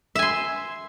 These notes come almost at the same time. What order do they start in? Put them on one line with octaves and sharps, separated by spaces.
E5 G#5 C6